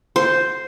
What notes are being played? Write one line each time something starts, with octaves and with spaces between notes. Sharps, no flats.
C5